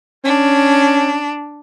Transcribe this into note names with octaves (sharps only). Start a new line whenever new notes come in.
C#4 D4